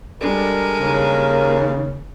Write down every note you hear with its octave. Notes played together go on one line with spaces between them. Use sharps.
G3 G#3 D4 A4 A#4
D#2 C#3